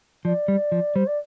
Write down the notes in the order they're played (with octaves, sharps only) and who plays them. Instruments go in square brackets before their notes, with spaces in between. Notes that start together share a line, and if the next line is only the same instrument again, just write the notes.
[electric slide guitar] F3 [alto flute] D5
[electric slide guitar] G3
F3
[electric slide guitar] G3 [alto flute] C5
[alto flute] D5